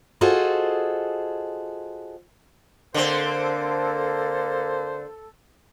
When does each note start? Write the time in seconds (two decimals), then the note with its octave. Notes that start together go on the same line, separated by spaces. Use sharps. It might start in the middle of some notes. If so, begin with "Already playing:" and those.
0.21 F4 F#4 G#4 A4 C5 D#5
2.94 D3 A#3 C4 A4 C5